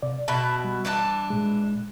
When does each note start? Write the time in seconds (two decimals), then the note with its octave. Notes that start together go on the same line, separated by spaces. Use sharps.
0.02 C3 D5
0.28 B2 E4 A5 B5
0.64 G3
0.85 E3 D4 A5
1.30 A#2 G#3